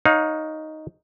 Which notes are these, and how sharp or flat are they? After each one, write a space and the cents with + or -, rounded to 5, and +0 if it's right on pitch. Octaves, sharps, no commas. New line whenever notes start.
D#4 +0 C#5 +0 F5 +30